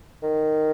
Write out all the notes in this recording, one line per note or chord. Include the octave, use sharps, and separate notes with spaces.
D#3